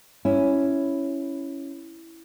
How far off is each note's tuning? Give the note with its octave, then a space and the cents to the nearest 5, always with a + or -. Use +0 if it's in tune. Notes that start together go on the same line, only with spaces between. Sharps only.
C#4 +0 E4 +0